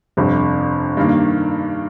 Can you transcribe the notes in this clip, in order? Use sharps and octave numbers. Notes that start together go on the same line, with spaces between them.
G1 F2 C3
G2 D#3 A#3